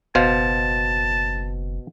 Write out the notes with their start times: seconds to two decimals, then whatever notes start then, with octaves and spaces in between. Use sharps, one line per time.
0.15 F#1 B2 C5 F5 A5